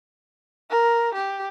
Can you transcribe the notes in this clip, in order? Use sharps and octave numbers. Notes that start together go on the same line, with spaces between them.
A#4
G4